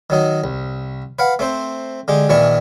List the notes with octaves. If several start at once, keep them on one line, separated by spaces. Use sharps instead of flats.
D#3 F#3 D#4
C2
B4 F5 F#5
A3 C4 C5
D3 G#3 G4
A#1 D#3 E3 D4 C#6